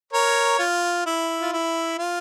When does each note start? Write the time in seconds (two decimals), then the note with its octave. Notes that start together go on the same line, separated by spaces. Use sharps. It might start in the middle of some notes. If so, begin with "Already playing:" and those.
0.13 A#4 C#5
0.59 F4
1.06 E4
1.41 F4
1.52 E4
1.98 F4